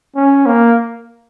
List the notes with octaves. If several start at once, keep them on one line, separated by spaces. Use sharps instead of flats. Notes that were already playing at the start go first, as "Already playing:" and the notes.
C#4
A#3